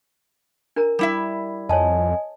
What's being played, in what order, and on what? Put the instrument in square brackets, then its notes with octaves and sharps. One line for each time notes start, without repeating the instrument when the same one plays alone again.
[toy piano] D4 A#4 A#5
[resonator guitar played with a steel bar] G3 E4 E5
[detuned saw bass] F2 [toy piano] C#5 A5 [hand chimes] D#5 G#5